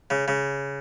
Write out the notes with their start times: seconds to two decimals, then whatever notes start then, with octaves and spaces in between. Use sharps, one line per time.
0.10 C#3
0.28 C#3